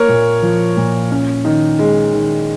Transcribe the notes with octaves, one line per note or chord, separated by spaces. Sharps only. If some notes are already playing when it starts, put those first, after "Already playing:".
Already playing: A#3 A#4 C#5
A#2
F3
A#2
C#4
D#3
G#3
D#3